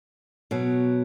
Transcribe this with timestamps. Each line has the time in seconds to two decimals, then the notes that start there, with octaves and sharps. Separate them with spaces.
0.51 B2 F#3